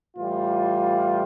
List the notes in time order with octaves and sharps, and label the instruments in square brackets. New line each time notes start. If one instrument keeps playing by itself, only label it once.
[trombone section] A2 E3 G3 F4